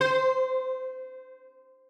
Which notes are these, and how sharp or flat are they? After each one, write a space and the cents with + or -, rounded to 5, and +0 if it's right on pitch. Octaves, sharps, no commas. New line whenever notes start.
C5 -20